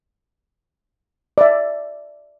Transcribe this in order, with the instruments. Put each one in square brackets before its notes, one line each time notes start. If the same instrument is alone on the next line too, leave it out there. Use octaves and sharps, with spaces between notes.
[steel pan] D5 E5